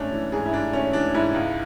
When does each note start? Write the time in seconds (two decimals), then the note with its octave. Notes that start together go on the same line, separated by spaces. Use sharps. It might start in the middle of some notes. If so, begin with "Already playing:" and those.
Already playing: G#2 A3 C#4 D4
0.13 E3
0.32 G#2 G#4
0.46 E4
0.53 G#2 D4
0.73 A3 C#4
0.93 E3 D4
1.14 G#2 E4
1.34 C#2